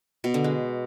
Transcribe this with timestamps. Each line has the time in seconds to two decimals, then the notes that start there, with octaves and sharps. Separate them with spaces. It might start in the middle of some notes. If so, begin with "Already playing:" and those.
0.24 B2
0.34 D3
0.44 G#3